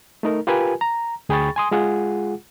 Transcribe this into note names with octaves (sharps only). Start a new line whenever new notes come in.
A3 D#4 A#4
F4 G4 A#4 B4 G#5
A#5
D2 G#4 G5 B5 C#6 A6
G#5 C6 D#6
G#3 F4 G#4 F#5